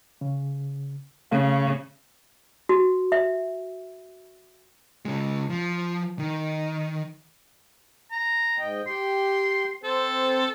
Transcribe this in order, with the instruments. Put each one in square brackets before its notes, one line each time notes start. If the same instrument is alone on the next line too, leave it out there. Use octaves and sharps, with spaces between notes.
[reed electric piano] C#3
[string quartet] C#3 [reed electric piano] A3 F5
[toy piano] F#4
E5
[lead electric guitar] C#3 G#3
F3
D#3
[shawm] A#5
[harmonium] G#2 D#5 G5
[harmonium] G4 G5 [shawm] C6
[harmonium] C4 C5 [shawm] A4